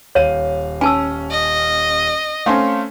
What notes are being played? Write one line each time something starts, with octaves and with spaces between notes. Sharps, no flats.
D#1 C#5 F5 D#7
C#4 G#5 A5 E6
D#5
A3 C4 C#4 F5 G#5 C6